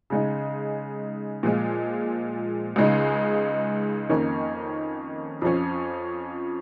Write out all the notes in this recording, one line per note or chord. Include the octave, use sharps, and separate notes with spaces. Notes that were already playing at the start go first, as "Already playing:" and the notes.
C#3 G#3 D#4
A#2 F3 G#3 F4
C#2 C#3 G#3 D#4
F2 D#3 A#3 C#4
F2 F3 C#4